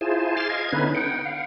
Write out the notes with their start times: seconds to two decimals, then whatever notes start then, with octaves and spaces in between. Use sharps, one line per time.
0.01 E4 F4 G#4 C5 G#5 A5
0.37 G#5 C6 D6 F6 A6
0.49 D#5 F5 G#6
0.72 D3 B3 C#4 D#4 E4 B4
0.95 F#5 G5
1.25 F5 F#5